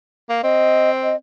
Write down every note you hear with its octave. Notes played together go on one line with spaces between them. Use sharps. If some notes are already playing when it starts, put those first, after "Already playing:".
A#3
C4 D#5
D#5